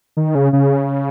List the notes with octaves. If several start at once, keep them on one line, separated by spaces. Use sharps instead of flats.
D#3
C#3
C#3